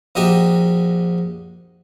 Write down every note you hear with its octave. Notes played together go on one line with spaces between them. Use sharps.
A#1 D#4 F#4 G4 D#5 E5